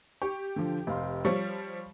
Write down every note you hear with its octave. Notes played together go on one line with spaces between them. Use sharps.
G4 C#6
D3 F3
F1 F5 C6
F3 G3 C#5 F5 C#6